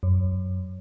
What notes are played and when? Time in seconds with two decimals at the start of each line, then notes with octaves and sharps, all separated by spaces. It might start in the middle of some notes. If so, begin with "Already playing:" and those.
0.03 F#2